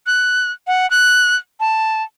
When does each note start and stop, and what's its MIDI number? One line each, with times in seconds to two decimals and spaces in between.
0.07 0.51 90
0.67 0.89 78
0.91 1.35 90
1.60 2.03 81